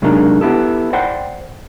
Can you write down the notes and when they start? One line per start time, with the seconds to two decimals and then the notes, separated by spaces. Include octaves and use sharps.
0.02 C3 F#3 G#3 A#3 D4 D#4
0.41 B3 E4 G4 A4
0.93 C5 D5 F#5 G5